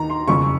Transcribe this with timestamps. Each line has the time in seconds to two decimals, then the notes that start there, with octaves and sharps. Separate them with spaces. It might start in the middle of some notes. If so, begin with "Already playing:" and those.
Already playing: D#2 D#3 A#5
0.10 C6
0.28 F#1 F2 C#3 C#6